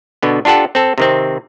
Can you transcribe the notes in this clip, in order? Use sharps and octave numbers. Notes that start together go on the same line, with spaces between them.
B2 D3 B3
D4 F4 G4 A4 F#5
C4 A4
C3 D#3 C4